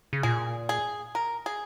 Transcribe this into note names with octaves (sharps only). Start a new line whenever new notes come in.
C#3
A#2 G#4
G#4
A#4
G#4